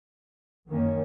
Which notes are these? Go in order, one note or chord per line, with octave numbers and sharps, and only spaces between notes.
F#2 D#3 A#3 C#4